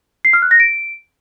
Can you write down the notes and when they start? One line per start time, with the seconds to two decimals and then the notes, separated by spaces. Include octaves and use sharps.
0.25 C7
0.33 F6
0.42 F#6
0.51 A#6
0.60 D7